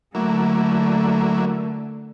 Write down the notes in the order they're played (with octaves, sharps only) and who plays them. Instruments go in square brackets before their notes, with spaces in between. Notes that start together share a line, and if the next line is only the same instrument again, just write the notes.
[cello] D3 A3 [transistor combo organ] F#3 A#3 E4